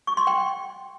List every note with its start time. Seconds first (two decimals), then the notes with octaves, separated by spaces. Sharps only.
0.07 C#6
0.17 C6
0.27 G5